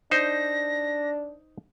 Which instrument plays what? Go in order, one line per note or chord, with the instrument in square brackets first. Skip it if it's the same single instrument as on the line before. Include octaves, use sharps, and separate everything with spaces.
[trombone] D4 [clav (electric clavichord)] D#4 C5 [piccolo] A#6